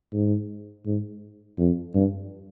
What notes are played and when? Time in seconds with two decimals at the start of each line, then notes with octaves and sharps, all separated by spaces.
0.13 G#2
0.86 G#2
1.58 F2
1.94 G2